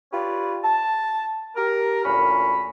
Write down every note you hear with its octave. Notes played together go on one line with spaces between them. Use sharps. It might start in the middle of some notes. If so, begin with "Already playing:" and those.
F4 G4 B4 C#5 D5
A5
G4 A#4
D2 A#2 C#4 B5